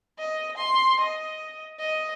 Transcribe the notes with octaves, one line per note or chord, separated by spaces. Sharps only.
D#5
C6
D#5
D#5